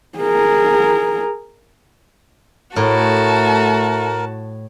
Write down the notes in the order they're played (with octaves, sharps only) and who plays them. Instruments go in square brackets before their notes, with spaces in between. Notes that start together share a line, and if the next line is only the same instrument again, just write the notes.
[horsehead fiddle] G#4 A#4
[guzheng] A2 [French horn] A3 [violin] F#4 A5 [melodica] A#4